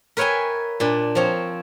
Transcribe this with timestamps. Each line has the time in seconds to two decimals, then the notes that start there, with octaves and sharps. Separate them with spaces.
0.17 A#4 B4 C#5 E5 G5 G#5
0.80 A#2 D4
1.15 F3 C4 C#5